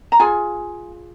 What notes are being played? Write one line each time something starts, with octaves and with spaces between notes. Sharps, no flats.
A#5
F4 G#4 G#5